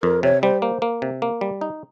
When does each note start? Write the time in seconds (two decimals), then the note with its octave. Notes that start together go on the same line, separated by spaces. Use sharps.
0.03 F2 A#4
0.23 C3 C#5
0.42 G3 C5
0.62 A#3 C5
0.82 A#3
1.02 C3
1.22 A#3
1.41 G3
1.61 D#4